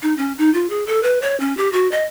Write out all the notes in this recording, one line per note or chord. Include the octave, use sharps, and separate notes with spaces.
D#4
C#4
D#4
F4
G#4
A4
B4
C#5
C#4
G4
F#4
D#5